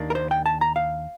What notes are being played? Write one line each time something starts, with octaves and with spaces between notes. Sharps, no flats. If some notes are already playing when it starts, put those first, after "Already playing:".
Already playing: D#2 D#3 A#3 D4
A#4
C5
G5
A5
A#5
F5